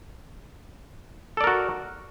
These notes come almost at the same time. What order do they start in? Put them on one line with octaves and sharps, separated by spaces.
A4 D5 A#4 F#4